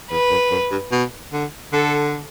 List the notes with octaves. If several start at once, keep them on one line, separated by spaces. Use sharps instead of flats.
E2 B4
F#2
F#2
G2
B2
D3
D3 A4